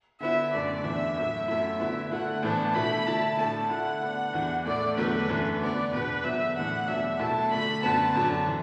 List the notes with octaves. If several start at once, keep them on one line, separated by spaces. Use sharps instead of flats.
D3 B3 E4 E5
F#2 D3 A3 D4 D5
E2 E3 D4 E5
A2 F#3 A3
F#2 F#3 A3 E4 E5
D3 B3 E4
D3 A3 E4 F#5
A2 E3 B3 D4 A5
B2 A3 E4 B5
D3 A3 E4 A5
A2 A3 D4 A5
D3 A3 E4 F#5
D3 B3 D4
E2 E3 D4
A2 A3 D4 D5
E2 D3 F#3 A3 B4
F#2 E3 A3
D3 B3 D4 D5
E2 B2 B3 B4
E2 D3 F#3 E5
A2 E3 D4 F#5
E2 B2 F#3 D4 E5
B2 F#3 A3 E4 A5
D3 A3 D4 B5
F#2 D3 B3 A5
F#2 D3 F#3 D4
E3